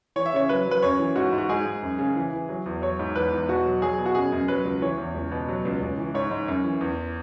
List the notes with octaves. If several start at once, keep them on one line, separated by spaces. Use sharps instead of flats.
E3 C#5
E5
C#3 C#5
F#3 B4
F#3
B4
F#2 C#5
E3
G#2 F#4
G#2
F#4
G#2 G#4
G#2
F#2
C#3
E3
E3
F#3
E2
F#3 C#5
G#2
E2 B4
E2
B2 F#4
F#3
F#3 G#4
B2
F#4
F#2 G#4
F#2
F#3 B4
C#2
E3 C#5
E2
C#2
B2
F#3
C#2
C#2
E3
G#2 C#5
G#2
F#2
E3
E2